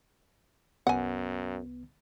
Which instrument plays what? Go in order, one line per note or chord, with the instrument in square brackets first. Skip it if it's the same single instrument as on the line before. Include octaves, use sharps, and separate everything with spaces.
[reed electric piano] C2 B3 [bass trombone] F#2 [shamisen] F#5 G#5